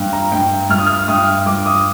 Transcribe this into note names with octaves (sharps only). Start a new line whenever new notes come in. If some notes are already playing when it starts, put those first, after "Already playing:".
Already playing: G2
A#5
G2 G5
G2 F6
D#6
F6
G2 D#6
G2 D6
D#6